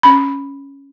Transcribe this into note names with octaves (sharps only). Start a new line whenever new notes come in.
C#4 B5